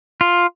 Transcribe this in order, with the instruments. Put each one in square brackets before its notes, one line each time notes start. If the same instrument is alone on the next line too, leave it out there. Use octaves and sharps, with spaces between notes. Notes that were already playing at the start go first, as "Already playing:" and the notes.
[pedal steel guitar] F4